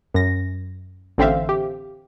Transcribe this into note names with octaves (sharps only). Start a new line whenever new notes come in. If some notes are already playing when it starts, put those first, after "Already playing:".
F#2 A#6
A1 D3 C4 C5 E5 F5
G4